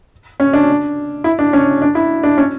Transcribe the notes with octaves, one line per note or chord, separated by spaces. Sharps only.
C#4
D4
E4
D4
C#4
D4
E4
D4
C#4